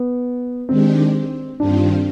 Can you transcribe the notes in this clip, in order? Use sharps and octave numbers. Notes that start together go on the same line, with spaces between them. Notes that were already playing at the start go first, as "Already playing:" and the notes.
Already playing: B3
D#3 G#3 C4 D4 G4
G2 D#3 G3 C4 D4 F4